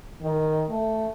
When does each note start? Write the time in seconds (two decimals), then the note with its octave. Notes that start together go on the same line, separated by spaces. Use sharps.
0.22 D#3
0.69 A3